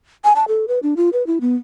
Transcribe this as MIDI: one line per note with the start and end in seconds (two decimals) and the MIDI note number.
0.24 0.33 80
0.36 0.45 81
0.48 0.66 69
0.68 0.79 71
0.83 0.94 62
0.97 1.09 65
1.13 1.25 71
1.27 1.39 64
1.41 1.56 59